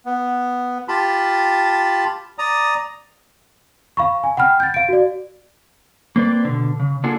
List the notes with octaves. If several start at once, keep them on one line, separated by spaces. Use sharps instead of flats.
B3
F4 G4 A5 B5
D5 A#5 D#6
F5 B5 C#6
G#5
F#5 G5 B5 F6
G6 A6
F5 D7
F#4 D5
A#3 C4 B4 D5
B2 D3
C#3
A#3 D4 F4 G#4 A4 F#5